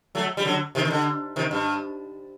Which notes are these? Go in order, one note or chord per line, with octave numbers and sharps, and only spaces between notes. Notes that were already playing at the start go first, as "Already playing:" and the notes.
F#3 A3
G3
D3 F#3
C3 D#3
D#3
D3
C3 D#3
G2